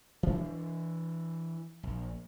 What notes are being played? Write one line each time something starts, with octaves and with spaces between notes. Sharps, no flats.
E3 D4
A#1